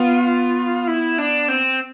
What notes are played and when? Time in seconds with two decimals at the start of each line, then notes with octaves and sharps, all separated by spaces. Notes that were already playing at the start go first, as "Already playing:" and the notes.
Already playing: B3 F4
0.87 E4
1.18 D4
1.48 C4